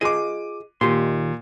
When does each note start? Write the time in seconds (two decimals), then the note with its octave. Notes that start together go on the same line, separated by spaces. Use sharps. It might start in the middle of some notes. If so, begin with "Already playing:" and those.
0.01 F4 G#4 D#5 D6 D#7
0.81 D#2 A#2 G4 C6